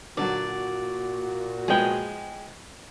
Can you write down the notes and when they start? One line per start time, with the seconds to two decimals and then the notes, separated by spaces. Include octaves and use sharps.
0.17 A#2 D3 F#3 F#4 D5
1.68 F3 G#3 B3 G#4 G5